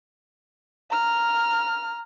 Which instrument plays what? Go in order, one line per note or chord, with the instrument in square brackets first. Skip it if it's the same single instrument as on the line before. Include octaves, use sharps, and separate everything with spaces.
[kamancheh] A#5 F6